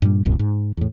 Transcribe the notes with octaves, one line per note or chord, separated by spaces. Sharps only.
G2 A#2 C#3 G3
D1 C2 F#2 A#2
G#2
E2 A2